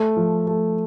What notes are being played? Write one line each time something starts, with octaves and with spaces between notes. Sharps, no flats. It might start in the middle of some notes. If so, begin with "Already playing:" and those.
Already playing: A3
F3
A3